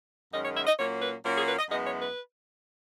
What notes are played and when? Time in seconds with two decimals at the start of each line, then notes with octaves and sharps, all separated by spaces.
0.32 F#2 D#3 G#3 C#4 D#5
0.44 C#5
0.56 E5
0.67 D#5
0.78 A#2 F#3 A#3 C#4 C#5
1.01 B4
1.24 A#2 F#3 A#3 C#4 A#4
1.36 G#4
1.47 B4
1.59 D#5
1.70 F#2 E3 G#3 B3 D#5
1.86 C#5
2.01 B4